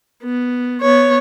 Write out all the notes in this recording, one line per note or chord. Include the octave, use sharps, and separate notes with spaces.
B3
B3 C#5